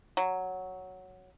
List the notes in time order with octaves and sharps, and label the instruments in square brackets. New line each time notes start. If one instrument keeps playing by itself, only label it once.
[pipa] F#3